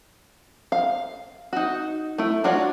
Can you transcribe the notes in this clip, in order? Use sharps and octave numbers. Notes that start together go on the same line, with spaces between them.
F5
D#4 F#4
A3 E4
D4 F4 F#4 C#5 D5